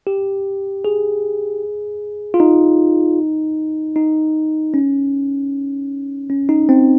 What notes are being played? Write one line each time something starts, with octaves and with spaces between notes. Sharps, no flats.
G4
G#4
F4
D#4
D#4
C#4
C#4
D#4
C4